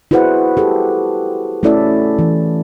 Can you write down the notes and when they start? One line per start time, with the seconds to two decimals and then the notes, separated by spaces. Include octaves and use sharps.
0.11 E4 F#4 G#4 B4 C5 F#5
0.57 G4 A4
1.63 A3 C#4 E4 A4 D5 E5
2.19 E3